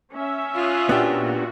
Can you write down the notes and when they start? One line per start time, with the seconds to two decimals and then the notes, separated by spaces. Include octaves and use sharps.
0.13 C#4 E5
0.54 F4 F5 D#6 F#6
0.89 A#2 B3 D4 F#4 G4